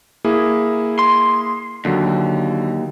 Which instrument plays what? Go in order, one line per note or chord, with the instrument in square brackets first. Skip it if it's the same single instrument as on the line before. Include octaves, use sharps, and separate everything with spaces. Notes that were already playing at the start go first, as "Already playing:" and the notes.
[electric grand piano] A#3 E4 G#4
[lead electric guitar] C6
[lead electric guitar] D#2 [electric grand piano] D3 F#3